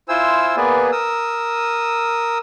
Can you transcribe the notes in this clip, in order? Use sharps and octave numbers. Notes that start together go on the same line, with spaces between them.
E4 F4 C5 G#5 E6
A#3 B3 G#4 B4 D5 G#5
A#4 D#6 E6